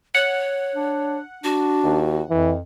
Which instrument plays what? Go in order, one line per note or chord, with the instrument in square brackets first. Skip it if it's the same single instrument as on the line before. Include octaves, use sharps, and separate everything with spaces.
[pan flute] C#5 [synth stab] F#5
[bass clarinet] D4
[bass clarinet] D4 [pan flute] F#4
[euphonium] D#2
[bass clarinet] F2 [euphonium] E3